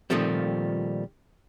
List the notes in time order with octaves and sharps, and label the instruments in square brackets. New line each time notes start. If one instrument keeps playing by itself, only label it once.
[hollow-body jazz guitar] A#2 D#3 F3 G3 A3 C4